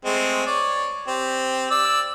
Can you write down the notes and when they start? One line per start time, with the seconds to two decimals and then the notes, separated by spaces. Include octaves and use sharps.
0.05 G#3 A3 C4
0.46 C#5 D5
1.08 C4 G4
1.70 D5 E6